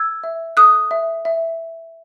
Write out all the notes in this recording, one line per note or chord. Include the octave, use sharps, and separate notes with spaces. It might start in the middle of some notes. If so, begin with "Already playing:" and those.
Already playing: E6 G#6
E5
A4 D#6 F#6
E5
E5